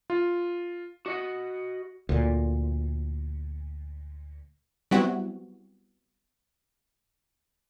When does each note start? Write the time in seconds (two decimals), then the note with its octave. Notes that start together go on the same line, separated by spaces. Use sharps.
0.10 F4
1.06 F#4 D#5 F#5
2.09 D2 A#2
4.91 F#3 G3 B3 C4 E4 F#4